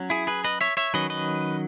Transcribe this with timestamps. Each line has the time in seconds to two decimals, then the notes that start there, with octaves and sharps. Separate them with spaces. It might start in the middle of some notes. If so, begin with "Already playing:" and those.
Already playing: F#3 C#4
0.10 E4 G#4
0.27 G#4 B4
0.44 B4 D#5
0.61 C#5 E5
0.77 C#5 E5
0.94 D#3 F#3 C#4 B4 D#5
1.10 B4 D#5